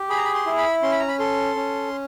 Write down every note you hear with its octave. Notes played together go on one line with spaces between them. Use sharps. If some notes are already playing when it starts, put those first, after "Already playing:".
Already playing: G4
G#4 B5
A#5
B5
C6
E4
B5
C#4 C6
B5
A#5
B5
A4 C6
C#4